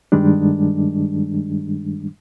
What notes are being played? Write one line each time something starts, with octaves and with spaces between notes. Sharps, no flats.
G2 D#3 G3 G#3 D4